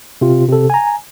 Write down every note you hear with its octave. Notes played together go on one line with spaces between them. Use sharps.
C3 F4
C3 A4
G#5 A#5